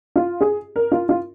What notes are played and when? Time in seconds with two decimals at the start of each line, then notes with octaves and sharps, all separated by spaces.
0.16 F4
0.41 G#4
0.76 A#4
0.92 F4
1.09 F4